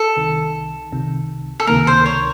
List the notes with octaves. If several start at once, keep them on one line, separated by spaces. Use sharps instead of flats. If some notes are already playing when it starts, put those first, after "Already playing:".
Already playing: A4
C2 C3 D#3
C2 C3 D#3
A4
C#2 C3 D#3 A#3 A#4
C5
C#5